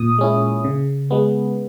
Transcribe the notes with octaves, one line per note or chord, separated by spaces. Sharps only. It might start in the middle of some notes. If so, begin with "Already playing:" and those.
Already playing: A#2 D#6
G#3 C#4 E4
C#3
G#3 B3